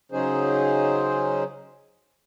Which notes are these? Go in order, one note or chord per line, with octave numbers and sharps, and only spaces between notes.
C#3 F#3 C#4 D#4 G#4 C5